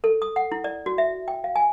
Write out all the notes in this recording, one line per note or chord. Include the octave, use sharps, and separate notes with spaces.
A4
D#6
F#5
E4
D5
F#4
E5
G5
F5
G#5